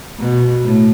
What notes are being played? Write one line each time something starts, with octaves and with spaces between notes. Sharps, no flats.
B2
A2